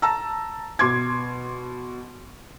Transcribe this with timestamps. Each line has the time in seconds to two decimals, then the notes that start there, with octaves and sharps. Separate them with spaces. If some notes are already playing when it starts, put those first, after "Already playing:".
0.02 A5 A#5 E6
0.79 B2 C6 D6 G#6